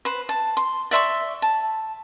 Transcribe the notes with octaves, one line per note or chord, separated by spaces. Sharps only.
B4 C5
A5
C6
D5 E5 C6 C#6
A5